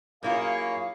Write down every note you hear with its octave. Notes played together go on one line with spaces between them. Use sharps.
F#2 A#3 E4 F4 G#4 C#5 F5